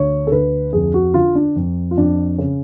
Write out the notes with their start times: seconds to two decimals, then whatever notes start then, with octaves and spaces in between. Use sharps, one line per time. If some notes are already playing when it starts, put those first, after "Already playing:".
Already playing: D2 C#5
0.27 A4
0.32 D2 B4
0.73 F2 G#4
0.94 F#4
1.14 D3 F4
1.35 D4
1.56 F2
1.91 F4
1.98 F2 D4
2.38 C#3 C#4